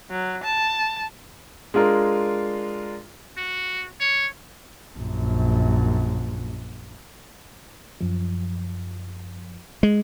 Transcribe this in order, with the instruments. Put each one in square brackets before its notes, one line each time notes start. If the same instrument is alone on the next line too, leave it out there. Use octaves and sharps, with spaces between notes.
[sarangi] F#3
A5
[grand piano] G#3 D4 F4 A#4
[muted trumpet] F#4
C#5
[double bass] A#1 F#2
[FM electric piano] F#2 F3
[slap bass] G#3